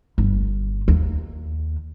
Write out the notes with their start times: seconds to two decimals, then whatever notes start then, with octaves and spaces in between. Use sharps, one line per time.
0.18 G1
0.88 D#2